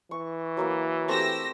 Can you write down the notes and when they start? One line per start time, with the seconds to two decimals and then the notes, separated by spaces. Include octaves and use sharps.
0.11 E3 C#6
0.57 F#3 A#3 E4
1.08 A3 C4 G4 E6 A#6